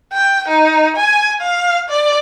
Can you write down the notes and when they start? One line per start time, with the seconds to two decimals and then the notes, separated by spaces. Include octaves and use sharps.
0.13 G5
0.48 D#4
0.96 G#5
1.41 F5
1.89 D5